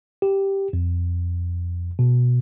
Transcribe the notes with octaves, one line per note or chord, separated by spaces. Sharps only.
G4
F2
B2